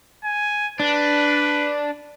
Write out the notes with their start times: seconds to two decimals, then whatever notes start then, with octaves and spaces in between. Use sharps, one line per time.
0.24 G#5
0.80 D4 B4